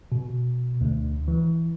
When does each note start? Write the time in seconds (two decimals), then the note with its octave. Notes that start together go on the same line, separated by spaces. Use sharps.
0.12 B2
0.81 D2
1.28 E3